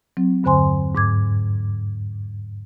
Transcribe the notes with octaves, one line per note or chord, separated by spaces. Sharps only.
F#3 C4
E2 G2 D3 C5 G#5 C6
G#2 D6 G#6